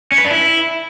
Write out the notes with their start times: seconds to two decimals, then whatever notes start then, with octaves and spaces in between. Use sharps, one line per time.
0.12 C#4
0.18 B4
0.25 D4
0.31 E4